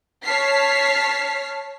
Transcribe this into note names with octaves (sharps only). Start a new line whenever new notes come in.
C#5 A5 F6 B6 C7